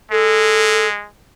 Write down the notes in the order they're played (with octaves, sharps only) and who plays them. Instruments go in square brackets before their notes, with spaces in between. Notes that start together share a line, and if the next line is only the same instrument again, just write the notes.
[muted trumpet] G#3 [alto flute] A4